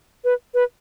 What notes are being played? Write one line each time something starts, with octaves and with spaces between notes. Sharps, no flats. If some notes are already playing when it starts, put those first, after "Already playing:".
B4
B4